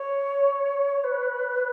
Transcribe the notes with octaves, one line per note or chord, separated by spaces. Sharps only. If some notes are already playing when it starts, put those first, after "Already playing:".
Already playing: C#5
B4